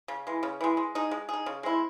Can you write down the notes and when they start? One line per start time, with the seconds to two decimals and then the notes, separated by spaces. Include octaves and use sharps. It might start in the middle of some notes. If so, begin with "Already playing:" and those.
0.08 C#3
0.27 E3 G#3
0.43 C#3
0.61 E3 G#3
0.77 G#3
0.95 D#4 G#4
1.11 G#3
1.29 D#4 G#4
1.46 C#3
1.63 G#3 C4 E4